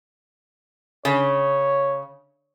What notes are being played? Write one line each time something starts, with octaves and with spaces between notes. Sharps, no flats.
C#3 C#5